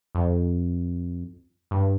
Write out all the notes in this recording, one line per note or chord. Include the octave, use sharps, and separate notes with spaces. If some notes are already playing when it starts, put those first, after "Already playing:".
F2
G2